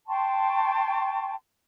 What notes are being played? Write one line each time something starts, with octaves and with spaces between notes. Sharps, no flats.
G5 A5 C6 C#6